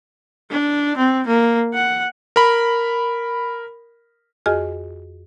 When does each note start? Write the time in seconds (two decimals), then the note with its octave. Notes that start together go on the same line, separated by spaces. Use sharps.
0.50 D4
0.97 C4
1.27 A#3
1.74 F#5
2.36 A#4 B5
4.46 F2 F#4 G#4 D#5 G#5 F6